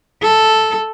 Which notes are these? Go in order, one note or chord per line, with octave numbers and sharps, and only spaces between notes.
A4